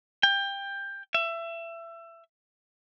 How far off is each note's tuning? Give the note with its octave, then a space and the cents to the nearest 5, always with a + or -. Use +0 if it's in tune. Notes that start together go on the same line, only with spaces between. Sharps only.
G5 +20
E5 +25